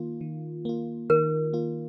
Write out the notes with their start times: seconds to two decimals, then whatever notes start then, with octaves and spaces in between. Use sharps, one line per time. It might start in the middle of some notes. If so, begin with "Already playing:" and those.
Already playing: D#3 A#3 F4
0.21 D#3
0.65 A#3 F4
1.10 D#3 A#4
1.53 A#3 F4